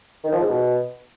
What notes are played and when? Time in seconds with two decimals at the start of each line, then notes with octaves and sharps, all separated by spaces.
0.24 D#3
0.32 F3
0.41 G#2
0.49 B2